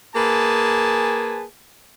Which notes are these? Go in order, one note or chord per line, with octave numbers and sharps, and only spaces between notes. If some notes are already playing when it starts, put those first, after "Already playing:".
A#3 G#4 B4 G#5 A5